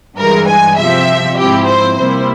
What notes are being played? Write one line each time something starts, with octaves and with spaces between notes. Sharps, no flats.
G2 E3 G#3 A#4
G#5
C3 F3 C4 E5
G#2 F3 C4 E4 G4
C5
C3 G3 A#3 E4 C5